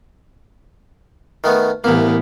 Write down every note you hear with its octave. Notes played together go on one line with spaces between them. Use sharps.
D#3 A3 B3
C2 A2 E3 A#3 B3